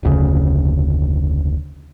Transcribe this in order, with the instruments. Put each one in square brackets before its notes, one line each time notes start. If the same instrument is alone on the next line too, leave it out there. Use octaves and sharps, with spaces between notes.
[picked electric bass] F1 D2 C#3